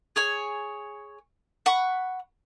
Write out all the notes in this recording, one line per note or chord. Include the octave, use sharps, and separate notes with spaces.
G#4 C#5 G#5
F#5 B5 C#6